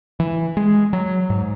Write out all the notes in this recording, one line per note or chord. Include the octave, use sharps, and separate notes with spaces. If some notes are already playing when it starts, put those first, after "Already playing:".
E3
G#3
F#3
G#2